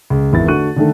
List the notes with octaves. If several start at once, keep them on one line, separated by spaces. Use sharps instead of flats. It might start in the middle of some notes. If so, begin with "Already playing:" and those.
C#2
G#1 E2 E4 A#4 A6
D3 A3 F#4 C#6 F#6 D#7
D3 D#3 A3